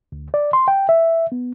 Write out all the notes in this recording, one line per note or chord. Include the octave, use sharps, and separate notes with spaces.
D2
D5
C6
G5
E5
B3